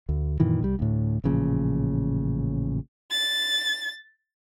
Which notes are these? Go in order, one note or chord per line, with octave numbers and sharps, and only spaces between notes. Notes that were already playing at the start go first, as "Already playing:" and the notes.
D2
F#2 A#2 D#3 E3
C2 G3
D2 A2
A1 A#2 C#3 F3
A6